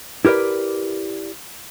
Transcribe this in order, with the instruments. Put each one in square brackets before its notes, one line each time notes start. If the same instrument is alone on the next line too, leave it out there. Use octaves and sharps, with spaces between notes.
[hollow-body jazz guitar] E4 G4 A#4 B4 D5